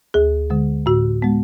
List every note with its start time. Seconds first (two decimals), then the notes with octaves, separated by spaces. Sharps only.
0.14 D2 G#4
0.50 D3 G#3
0.86 A2 F#4
1.22 G#3 B3